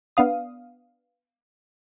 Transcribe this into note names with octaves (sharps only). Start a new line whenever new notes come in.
B3 D4 F5 D#6